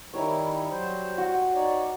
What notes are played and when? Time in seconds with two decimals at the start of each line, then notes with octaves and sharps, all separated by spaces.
0.14 D#3 G3 D#4 E4 C#5
0.71 F#3 C5
1.18 F#4
1.54 D#4 C#5 D5